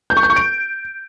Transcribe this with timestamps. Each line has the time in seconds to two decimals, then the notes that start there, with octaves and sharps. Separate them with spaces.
0.10 G6
0.17 C#6
0.23 G6
0.30 C#6
0.36 D7